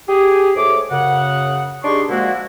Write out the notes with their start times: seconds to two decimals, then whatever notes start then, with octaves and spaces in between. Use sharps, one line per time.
0.08 G4 G#4
0.56 G#2 A3 C#5 D6
0.90 F#2 C#3 F#5
1.84 D4 D#4 G4 G#4 C6 C#6
2.09 A#2 F3 G#3 A#3 E4 F#4